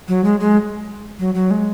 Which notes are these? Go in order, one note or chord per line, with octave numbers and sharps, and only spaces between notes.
F#3
G#3
G#3
F#3
F#3
G#3